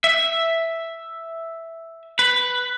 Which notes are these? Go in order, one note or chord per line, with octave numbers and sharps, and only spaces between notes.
E5
B4